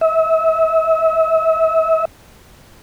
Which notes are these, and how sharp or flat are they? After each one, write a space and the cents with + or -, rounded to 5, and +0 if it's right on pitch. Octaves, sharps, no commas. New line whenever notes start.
E5 -35